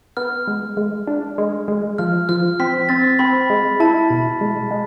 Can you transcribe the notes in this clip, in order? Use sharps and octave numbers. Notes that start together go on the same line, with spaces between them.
B3 F6
G#3
G#3
D4
G#3
G#3
F3 F6
F3 F6
C4 B6
C4 A6
C4 B5
G#3
E4 A5
B2
G#3
G#3